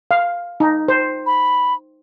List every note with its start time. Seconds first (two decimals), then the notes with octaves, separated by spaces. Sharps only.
0.11 F5
0.60 D#4
0.88 C5
1.26 B5